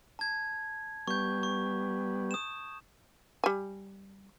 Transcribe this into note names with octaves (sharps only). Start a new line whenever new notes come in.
A5 G#6
G3 B3 C#6 G6
C#6
D#6 E7
G3 G#5